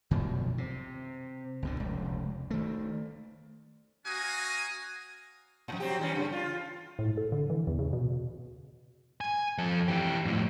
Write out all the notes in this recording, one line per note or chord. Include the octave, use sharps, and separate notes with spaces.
F#2 B2 D#3 F3
C3
C#2 B2 D3
F1 C#2
D#3 A3
C#4 F#4 F5 G#5 A#5 D#6
F2 A2
F#3 C4 G4
E3 G3 C#4
G2 C#3
F4
A2
A4
D3
E3
E2
C#3
B2
G#5
F2 A4
E3 G4
F2 A2